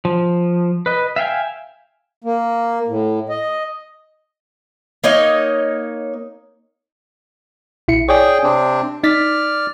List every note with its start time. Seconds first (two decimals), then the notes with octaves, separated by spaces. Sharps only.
0.05 F3
0.86 B4 D#5
1.16 E5 F5 G5 G#5
2.24 A#3
2.88 A2
3.29 D#5
5.04 A#3 D#4 C#5 D#5
7.88 A#1 E4 C#7
8.09 G#4 C#5 D5 G5
8.44 C3 C4 D4
9.04 D#4 D5 F6 A6 B6